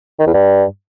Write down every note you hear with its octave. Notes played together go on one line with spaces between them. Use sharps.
D#3
E2
G2